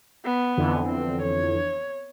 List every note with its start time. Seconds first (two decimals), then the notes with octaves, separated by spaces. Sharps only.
0.25 B3
0.57 F2 D3 E3
0.86 C4
1.21 C#5